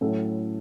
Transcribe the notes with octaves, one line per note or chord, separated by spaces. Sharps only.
A2 F#3 C#4 E4 A4